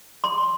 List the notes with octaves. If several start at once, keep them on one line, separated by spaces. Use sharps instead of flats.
C6